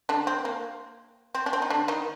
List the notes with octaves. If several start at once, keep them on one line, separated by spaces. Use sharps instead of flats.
D3 D4
C4
A#3
C4
D4
C4
D#4
D3 D4
D#3 D#4